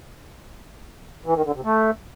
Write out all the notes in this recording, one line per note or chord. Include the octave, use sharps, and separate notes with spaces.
E3
D#3
D3
C3
A3